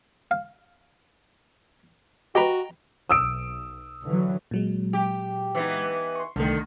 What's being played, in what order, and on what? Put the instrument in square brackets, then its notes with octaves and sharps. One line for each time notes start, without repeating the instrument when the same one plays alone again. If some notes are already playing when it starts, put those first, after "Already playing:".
[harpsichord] F5
[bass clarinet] F#4 [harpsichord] G4 B4 [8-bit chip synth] D#5 G5 A#5
[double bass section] B1 [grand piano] D#6 E6 D7
[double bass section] D3 E3 F#3
[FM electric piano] A#2 F#3 G#3
[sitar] G4
E3 B3 D#4
[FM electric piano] C6 C#6
[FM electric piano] C2 A3 [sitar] D3 D#3